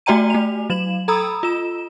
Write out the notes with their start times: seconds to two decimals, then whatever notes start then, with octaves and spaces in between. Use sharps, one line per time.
0.06 A3 F#4 D5 G5 A#5 D#7
0.30 A3 F7
0.70 F#3 E7 F#7
1.08 A4 A#5 B5 D#6 E6
1.43 F4 E7